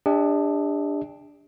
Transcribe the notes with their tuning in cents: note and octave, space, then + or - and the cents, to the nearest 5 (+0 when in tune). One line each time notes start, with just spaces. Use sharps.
D4 +0 G4 +45 D#5 +45